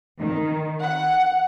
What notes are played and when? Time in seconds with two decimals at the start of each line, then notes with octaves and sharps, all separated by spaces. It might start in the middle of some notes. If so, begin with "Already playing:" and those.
0.18 D#3
0.82 F#5